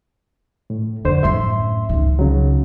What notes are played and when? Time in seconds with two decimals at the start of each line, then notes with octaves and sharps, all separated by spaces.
0.70 A2
1.05 F2 D3 C5
1.23 F#2 A2 E5 C6
1.89 C#2 D#3
2.19 C#3 F#3